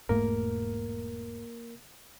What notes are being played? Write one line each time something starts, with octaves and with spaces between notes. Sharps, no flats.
E1 G#2 A3 A#3 A#4